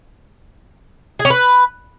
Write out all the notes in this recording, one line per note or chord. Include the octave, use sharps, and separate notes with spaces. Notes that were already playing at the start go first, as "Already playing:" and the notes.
G#4
C#4
B4